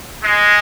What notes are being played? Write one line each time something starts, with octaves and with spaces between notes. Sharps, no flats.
G#3